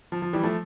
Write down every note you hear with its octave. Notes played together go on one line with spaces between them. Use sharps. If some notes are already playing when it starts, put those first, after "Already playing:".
F3
F3
E3 G3
F3 A3